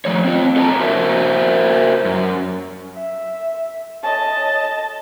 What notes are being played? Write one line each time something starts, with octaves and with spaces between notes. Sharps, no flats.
F3 A3 C#5
C4 F4
A4 C#5 D#5 G5 A5 A#5
F#4 A#4 C5 E5
F#2
E5
A4 C#5 D#5 G#5 A5